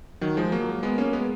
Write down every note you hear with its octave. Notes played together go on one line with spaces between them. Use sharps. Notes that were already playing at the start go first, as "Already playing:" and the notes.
D#3 F#3
F3 G#3
F#3 A#3
G#3 B3
A#3 C#4
G#3 B3